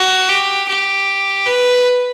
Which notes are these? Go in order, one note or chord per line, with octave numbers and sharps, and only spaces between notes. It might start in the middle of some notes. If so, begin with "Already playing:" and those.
Already playing: F#4
G4
G4
B4